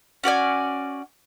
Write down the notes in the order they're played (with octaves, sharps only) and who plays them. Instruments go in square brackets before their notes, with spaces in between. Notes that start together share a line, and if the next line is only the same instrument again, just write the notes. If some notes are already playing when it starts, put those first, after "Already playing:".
[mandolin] C#4 F#4 D5 G#5